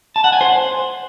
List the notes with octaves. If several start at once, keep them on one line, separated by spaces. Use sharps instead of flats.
A5
F#5
G#5
C5